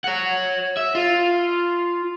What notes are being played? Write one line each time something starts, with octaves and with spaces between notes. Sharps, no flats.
C#5 F#5
E5
F4